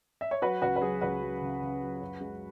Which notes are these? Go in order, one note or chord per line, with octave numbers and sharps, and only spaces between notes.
E5
C#5
F#3 F#4 B4
C#2 F#4 B4
B4
F#3 G#4
C#2 F#4 B4
F#3
C#3
C#3
F#3
F#2
G#3